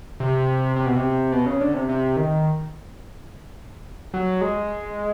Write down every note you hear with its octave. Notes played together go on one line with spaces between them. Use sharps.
C3
C3
B2
C3
B2
C#3
D3
C3
C3
D#3
F#3
G#3